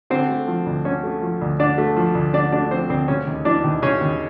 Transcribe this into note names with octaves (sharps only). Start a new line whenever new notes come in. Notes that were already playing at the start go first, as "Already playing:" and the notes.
D3 C4 C5
A3
F3
D2
D3 C#4 C#5
A3
F3
D2
D3 D4 D5
A3
F3
D2
D3 D4 D5
A3 D4 D5
F3 C4 C5
D2 C4 C5
C#3 C#4 C#5
D#2
E3 D4 D5
D#2
C#3 C#4 C#5
D#2